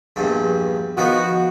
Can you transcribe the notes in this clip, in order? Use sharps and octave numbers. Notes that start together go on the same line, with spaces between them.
A#1 E2 G2
D#3 F3 B3 F#4